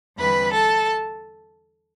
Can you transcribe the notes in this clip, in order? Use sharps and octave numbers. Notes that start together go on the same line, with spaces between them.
E2 D3 G3 C4 B4 B5
A4 A5